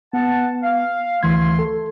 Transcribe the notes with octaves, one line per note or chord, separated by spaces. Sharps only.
B3 F#5 A5
F5
D2 E3 A3 C6 G#6
A4